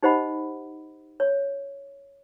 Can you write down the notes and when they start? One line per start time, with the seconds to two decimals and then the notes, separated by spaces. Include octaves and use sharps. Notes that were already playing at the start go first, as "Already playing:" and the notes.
0.03 D#4 G4 C5 D#5 F#5 B5
1.20 C#5